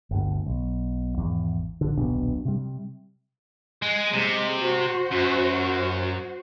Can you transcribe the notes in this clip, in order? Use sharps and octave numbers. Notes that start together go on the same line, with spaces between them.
G1 D2
B1
G#1 E2
A#1 D3
D#1 B1 B2 D4
C3 G3
G#3
C3 G#3
F#4 C5
F#2